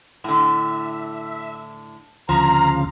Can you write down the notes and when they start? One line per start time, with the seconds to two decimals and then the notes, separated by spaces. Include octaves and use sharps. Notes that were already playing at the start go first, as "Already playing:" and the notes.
0.24 A2 D3 E5
2.29 D2 C#3 F3 F5 A#5